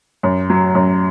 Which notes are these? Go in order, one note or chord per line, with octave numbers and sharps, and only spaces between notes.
F#2
F#3
F#2